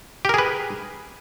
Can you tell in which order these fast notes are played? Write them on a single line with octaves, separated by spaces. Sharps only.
G4 A#4 G#4 B4